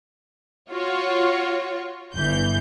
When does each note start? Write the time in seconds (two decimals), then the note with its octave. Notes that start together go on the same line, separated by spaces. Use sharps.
0.70 F4 F#4 C#5
2.14 G1 E3 G6